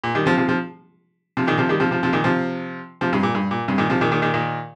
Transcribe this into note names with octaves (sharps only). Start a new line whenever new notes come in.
A#2
D#3 G3
C3 F3
C3 F3
C3 F3
C3 F3
A#2 D#3
C3 F3
D#3 G3
C3 F3
C3 F3
C3 F3
A#2 D#3
C3 F3
C3 F3
G2 C3
A#2
G2
A#2
G2 C3
A#2 D#3
C3 F3
A#2 D#3
A#2 D#3
A#2 D#3
A#2 D#3